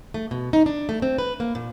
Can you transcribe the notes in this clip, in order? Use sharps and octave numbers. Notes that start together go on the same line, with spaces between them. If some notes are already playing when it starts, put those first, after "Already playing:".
A3
B2
D#4
D4
A3
C4
B4
A#3
A#2